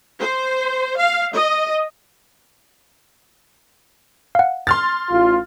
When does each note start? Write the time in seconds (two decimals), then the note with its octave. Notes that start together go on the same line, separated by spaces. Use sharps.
0.20 C5
0.99 F5
1.34 D#5
4.35 F5 F#5
4.67 C6 F6 A6
5.10 A1 F4